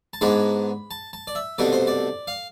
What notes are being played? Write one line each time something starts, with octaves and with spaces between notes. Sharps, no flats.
A5
G#2 G#3 B3 D4 B5
A5
A5
D5
E5
C2 B2 A3 D4 D5
C5
D5
F5